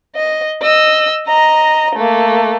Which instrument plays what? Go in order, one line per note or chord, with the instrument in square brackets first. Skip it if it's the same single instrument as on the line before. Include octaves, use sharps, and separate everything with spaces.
[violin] D#5
D#5 E6
D#5 A#5
A3 A#3